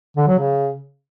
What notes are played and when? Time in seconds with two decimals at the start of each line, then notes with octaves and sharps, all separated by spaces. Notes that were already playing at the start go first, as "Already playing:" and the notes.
0.17 D3
0.28 F#3
0.39 C#3